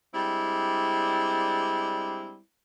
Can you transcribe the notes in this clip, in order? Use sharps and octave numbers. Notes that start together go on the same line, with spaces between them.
G3 G#3 C4 D4 E4